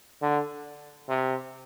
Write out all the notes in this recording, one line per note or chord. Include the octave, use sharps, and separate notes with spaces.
D3
C3